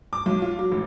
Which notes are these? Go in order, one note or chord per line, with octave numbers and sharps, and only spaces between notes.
D6
B1
F4
F#3
A1